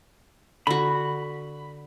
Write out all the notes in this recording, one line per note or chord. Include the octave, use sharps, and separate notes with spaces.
D3 F#4 B5